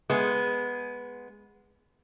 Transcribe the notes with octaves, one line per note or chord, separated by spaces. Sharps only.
G#3 B3